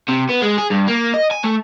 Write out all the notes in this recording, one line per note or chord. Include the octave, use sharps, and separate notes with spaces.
C3
B3
G#3
G#4
G2
A#3
D#5
G#5
A3